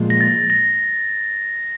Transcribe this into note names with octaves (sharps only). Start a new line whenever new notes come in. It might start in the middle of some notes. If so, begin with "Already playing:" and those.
Already playing: A#2 F3 G#3
A#6
A6
A#6